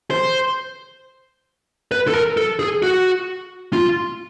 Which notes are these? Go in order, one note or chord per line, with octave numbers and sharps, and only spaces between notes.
C5
B4
A4
A#4
A4
G#4
F#4
F4